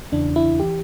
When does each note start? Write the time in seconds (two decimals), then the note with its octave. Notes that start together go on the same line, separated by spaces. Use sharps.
0.12 E2 C#3 E3 D4
0.36 E4
0.60 E3 G4